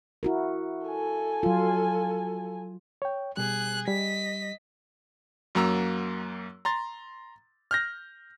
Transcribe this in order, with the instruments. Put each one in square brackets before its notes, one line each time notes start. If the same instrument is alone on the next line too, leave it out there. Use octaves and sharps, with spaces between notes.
[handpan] E4 F#4 A#4
[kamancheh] A4 G#5
[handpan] F#3 F4
[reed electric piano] C#5 G5
[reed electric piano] B2 G3 [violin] G#4 F#6
[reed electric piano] G3 [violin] D#5 B6
[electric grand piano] F#2 F#3 A#3 A#5 E6
A#5 C6 A6
F6 G6 A#6